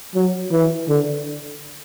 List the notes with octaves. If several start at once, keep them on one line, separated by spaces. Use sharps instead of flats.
F#3
E3
D3